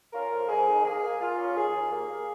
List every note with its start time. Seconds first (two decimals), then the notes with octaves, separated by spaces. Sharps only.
0.13 C#4 F4 A#4
0.31 F2
0.49 F2 G#4
0.68 D#3
0.84 A#3 G#4
1.02 A#3
1.20 A#3 F4
1.38 C#4
1.57 D#2 G#4
1.74 D#2
1.92 A#3
2.10 A#3